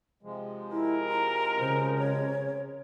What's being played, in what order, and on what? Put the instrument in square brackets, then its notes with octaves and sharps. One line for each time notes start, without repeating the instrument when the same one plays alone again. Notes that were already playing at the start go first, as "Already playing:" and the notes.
[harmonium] C3 F3 G#3
[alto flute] E4 [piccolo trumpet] A#4
[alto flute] A#5
[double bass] C#3 [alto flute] C5
[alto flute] C#5